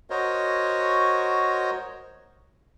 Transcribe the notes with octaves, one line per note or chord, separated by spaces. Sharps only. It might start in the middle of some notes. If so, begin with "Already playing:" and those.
F#4 A#4 C5 C#5 D#5